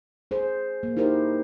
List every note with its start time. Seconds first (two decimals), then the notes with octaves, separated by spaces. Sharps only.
0.31 G#4 C5
0.83 A#3
0.97 D#4 E4 G4 A#4 C5